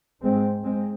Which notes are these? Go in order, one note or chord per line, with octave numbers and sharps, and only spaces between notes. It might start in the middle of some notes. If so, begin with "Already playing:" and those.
G#2 G#3 C4
G#2 G#3 C4